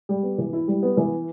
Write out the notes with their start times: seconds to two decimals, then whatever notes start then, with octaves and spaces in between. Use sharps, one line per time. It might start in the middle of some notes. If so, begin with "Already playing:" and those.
0.09 G3
0.23 B3
0.38 E3
0.53 E4
0.68 G3
0.83 B3
0.97 E3